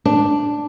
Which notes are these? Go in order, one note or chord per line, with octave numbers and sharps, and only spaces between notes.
D4